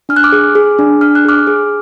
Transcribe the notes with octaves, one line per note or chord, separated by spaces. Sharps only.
D4 F6
F#6
D6 F6
G#4
G#4
D4
D4 F6
F#6
G#4 D6 F6
G#4